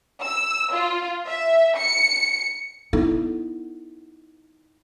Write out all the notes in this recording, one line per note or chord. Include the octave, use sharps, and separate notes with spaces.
E6
F4
E5
C#7
B3 D#4 E4 A4